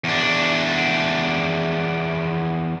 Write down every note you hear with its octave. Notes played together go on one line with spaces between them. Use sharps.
E2 D4